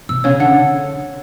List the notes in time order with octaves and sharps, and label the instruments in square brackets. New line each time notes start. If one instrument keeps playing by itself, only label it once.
[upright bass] B2 [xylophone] E6
[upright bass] C#3 [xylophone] C#5
[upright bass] D3 [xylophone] F#5